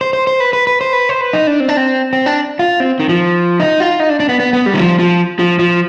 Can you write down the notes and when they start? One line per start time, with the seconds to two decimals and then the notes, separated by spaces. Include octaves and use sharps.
0.01 C5
0.13 C5
0.27 C5
0.40 B4
0.53 B4
0.67 B4
0.81 C5
0.93 B4
1.09 C5
1.21 B4
1.33 D#4
1.47 D4
1.60 C4
1.69 D4
1.77 C4
2.13 C4
2.26 D4
2.59 F4
2.80 C4
3.00 D#3
3.09 F3
3.60 D#4
3.80 F4
4.00 D#4
4.09 D4
4.20 D4
4.29 B3
4.40 B3
4.53 B3
4.66 G3
4.74 D#3
4.79 F3
4.99 F3
5.39 F3
5.59 F3